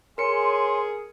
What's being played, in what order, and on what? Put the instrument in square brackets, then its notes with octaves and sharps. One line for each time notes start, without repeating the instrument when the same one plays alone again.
[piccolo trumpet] G#4 [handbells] A#4 C#7 [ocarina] C#5 [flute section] G#5 C6